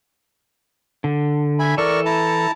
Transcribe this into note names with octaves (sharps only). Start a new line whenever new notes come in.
D3
E5 G#5 B5
E3 A4 A#4 D5 C#6
E4 A5 A#5